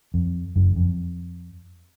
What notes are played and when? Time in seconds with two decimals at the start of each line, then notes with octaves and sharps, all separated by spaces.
0.14 F2
0.56 F#1 F#2
0.76 F2